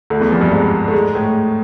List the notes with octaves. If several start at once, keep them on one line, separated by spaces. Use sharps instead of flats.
D2 D3
E2 E3
F2 F3
G2 G3
G#2 G#3
A3
G#2 G#3
A2 A3